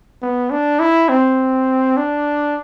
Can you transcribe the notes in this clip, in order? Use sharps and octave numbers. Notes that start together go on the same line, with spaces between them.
B3
D4
E4
C4
D4